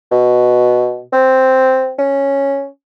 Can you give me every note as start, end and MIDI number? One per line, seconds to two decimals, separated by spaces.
0.12 1.01 47
1.13 1.92 60
1.99 2.66 61